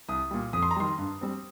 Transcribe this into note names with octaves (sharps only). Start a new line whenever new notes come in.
C2 D#6
A#2 G3
F2 D#6
C6
A#5
D#3 G3 C6
G2
G3 C4